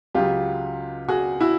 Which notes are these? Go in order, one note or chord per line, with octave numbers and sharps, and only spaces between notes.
C#2 C#3 F#3 F4 G4
F#4 G#4
E4 F#4